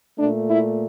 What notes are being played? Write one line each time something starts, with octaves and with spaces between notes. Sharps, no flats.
A#2 A3 D4
E4